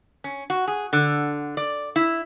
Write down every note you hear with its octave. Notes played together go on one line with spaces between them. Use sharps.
C#4
F#4
G#4
D3
D5
E4